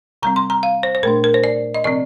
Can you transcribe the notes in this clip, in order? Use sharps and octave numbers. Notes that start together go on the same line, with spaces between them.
C3 G3 C4 A#5
C6
A#5
F5
C5
C5
A#2 A3 D4 A#4
A#4
C5
D5
D#5
C3 F3 C4 D5